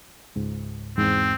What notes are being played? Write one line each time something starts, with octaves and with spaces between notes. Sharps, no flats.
C#2 G#2
E2 G#2 C4